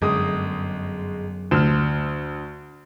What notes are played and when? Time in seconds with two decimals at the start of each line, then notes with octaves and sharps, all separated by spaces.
0.02 G1 F#2 G#3 D#6
1.51 D2 F6 E7